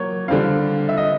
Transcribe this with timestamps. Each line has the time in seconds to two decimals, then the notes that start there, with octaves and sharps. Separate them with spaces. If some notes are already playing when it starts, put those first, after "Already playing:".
Already playing: F#3 A#3 C#5
0.28 D3 G3 C4 F5
0.89 E5
0.97 D#5